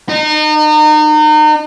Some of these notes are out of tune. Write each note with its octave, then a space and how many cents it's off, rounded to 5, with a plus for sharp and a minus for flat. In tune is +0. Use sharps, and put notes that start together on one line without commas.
D#4 -35